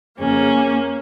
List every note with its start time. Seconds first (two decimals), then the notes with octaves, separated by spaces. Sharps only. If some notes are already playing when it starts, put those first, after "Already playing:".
0.17 F2 C#3 A#3 C#4